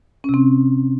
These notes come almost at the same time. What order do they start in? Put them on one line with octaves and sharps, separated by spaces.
C#4 C3 C4